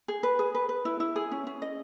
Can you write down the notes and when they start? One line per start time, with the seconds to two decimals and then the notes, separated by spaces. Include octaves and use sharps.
0.08 G#4
0.23 B4
0.39 G#4
0.55 B4
0.69 B4
0.85 E4
1.00 E4
1.16 G#4
1.31 C#4
1.47 C#4
1.62 D#5